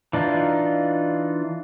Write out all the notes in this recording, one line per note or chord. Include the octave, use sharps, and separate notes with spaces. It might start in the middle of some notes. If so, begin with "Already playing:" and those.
E3 D4 D#4 F4